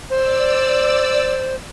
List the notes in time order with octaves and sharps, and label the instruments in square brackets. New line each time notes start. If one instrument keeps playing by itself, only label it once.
[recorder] C5 [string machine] D5 E6